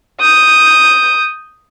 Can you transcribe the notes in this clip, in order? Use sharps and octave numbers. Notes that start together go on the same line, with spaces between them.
D#6 G6